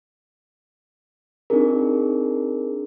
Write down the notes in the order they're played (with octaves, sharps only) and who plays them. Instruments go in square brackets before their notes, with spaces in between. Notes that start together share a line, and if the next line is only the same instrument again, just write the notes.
[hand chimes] C4 D4 D#4 F4 G#4 A#4